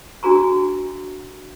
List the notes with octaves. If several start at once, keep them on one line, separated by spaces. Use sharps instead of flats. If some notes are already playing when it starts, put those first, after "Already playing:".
D4 F#4 G#4 A#5 C#6